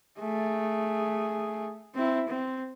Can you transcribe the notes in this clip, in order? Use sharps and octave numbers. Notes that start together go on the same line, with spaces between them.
A3 G#4
C4 E4
C4